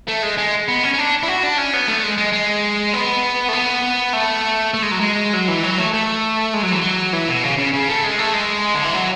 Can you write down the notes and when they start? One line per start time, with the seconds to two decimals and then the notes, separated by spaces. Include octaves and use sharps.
0.08 A3
0.23 G#3
0.38 G#3
0.68 B3
0.83 C#4
0.94 C#4
0.98 D4
1.23 E4
1.28 F#4
1.43 D4
1.58 C#4
1.73 B3
1.88 A3
2.04 G#3
2.18 G#3
2.33 G#3
2.94 B3
3.49 A3
3.53 B3
4.13 A3
4.74 A3
4.82 G#3
4.91 F#3
5.00 G#3
5.33 F#3
5.48 E3
5.63 F#3
5.78 A3
5.93 A3
6.54 G#3
6.63 F#3
6.72 E3
6.81 F#3
7.13 E3
7.28 B2
7.44 C#3
7.58 C#3
7.73 C#3
7.88 A3
8.04 G#3
8.19 A3
8.33 G#3
8.75 D3
8.83 E3
8.94 F#3